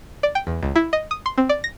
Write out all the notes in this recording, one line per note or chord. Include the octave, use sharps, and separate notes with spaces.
D5
G5
E2
C#2
E4
D#5
D#6
C6
C4
D5
A#6